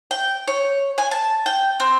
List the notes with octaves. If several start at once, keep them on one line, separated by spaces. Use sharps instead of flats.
G5
C#5
G#5
A5
G5
C4